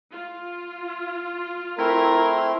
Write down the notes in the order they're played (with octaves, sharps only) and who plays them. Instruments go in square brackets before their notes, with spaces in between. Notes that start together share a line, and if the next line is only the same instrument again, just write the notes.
[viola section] F4
[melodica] A3 C4 C6 [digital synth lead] E4 [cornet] A#4